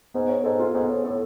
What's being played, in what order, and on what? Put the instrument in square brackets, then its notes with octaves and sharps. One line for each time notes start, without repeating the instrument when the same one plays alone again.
[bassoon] G#2 [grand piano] B3
[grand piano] C#5
[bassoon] G#2 [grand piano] A4
[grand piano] F4
[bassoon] G#2 [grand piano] B3
[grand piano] C#5
[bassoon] A2 [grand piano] A4